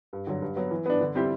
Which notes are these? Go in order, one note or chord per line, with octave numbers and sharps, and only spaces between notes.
G2
D3 F#3
G2
F#3 B3
E3
B3 D4
D3
G3 C4 E4 G4